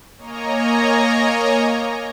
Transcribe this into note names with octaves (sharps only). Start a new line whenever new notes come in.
A#3 C#5 D#5 G#5 A#5